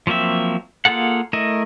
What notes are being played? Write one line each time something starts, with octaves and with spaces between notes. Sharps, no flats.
F3 F#3 A#3 C4 E5
A#3 F4 G#4 A4 F#5
A3 E4 A#4 D#5